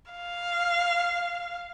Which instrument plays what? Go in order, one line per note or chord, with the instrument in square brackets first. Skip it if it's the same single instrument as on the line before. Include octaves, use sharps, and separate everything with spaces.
[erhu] F5